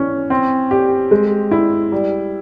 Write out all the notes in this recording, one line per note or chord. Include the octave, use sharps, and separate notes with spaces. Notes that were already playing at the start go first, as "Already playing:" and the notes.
Already playing: E3 C#4
C4
G4
G#3
E4
G3